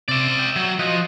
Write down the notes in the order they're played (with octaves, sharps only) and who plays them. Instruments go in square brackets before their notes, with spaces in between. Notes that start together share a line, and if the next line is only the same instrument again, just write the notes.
[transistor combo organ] C3 D6 [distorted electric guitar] D5 E5
[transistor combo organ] G5 E6
[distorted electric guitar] F#3
[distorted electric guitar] F3 [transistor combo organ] F#4 D#5